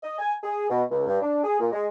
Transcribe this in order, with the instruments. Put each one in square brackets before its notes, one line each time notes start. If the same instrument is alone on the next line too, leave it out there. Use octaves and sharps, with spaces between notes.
[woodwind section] D#5
G#5
G#4
B2
C#2
G2
D4
G#4
A#2
G#3